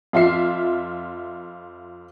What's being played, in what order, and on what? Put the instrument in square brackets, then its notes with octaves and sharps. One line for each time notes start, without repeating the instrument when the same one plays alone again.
[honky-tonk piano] F2 F4 E5 C7